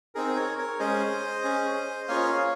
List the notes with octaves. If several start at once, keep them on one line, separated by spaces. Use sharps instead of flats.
C4 D#4 G#4 A#4
A#4 C#5
A#4 C#5
G#3 C#4 G#4 C5 D#5
C#4 G#4
A#3 C#4 F4 G#4 C#5 F5